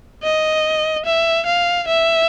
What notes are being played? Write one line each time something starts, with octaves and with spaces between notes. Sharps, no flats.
D#5
E5
F5
E5